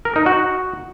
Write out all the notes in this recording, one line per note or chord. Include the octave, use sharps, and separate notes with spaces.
A#4
D#4
F#4